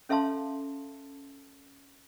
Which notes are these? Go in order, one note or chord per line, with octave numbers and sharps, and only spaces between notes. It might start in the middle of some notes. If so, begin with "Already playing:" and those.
C#4 A4 E5 F5 A5 C6